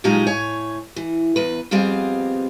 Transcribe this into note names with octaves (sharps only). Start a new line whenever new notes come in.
A#2 F3 F#3 G#3 D#4 G4
A2 C#5 G#5
E3
E2 B4
F2 G3 B3 C4 G#4 F5